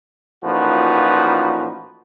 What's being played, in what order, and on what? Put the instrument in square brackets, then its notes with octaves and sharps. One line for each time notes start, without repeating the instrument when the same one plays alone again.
[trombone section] A1 A#2 F3 D#4 F#4 B4